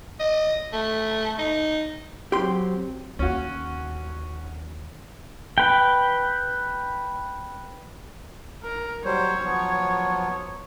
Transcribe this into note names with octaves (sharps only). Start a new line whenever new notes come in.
D#5
A3
D#4
F#3 C4 G4 C6
D#2 C#4 F#4
B4 G5
A#4
F#3 G3 C5 C#5
F3 F#3 B3